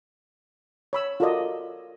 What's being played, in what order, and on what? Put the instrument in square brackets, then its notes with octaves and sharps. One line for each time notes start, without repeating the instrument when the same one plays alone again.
[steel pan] C#5 B5 E6
F4 F#4 A4 A#4 D5 D#5